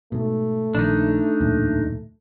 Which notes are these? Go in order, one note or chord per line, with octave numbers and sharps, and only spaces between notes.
G#2 B2 A3
A#1 D#3 D4 D#4
D1 E2 A#2